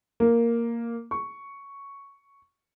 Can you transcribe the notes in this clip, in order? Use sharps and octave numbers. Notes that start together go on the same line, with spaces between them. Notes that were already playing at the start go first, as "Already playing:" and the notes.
A#3
C#6